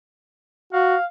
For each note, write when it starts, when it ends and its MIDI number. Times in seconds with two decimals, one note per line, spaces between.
0.73 0.96 66
0.73 1.04 77